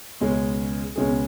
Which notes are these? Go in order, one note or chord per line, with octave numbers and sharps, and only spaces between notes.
C#2 B2 G#3 C#4 G#4
C#2 B2 G#3 C#4 G#4